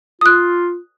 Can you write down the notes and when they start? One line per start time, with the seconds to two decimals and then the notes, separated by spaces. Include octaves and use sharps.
0.21 F4 D#6 F#6